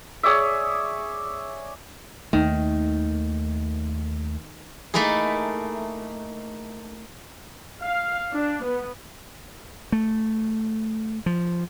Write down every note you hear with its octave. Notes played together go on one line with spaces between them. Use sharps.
G#4 C#5 D5 E5
D#2 D#3 A3
A3 A#3 D#4 E4 G#4
F5
D4
B3
A3
F3